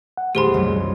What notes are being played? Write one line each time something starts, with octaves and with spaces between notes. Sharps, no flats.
F#5
D#1 E2 A3 G4 G#4 C5 B5 C6
C2 F#2 F#3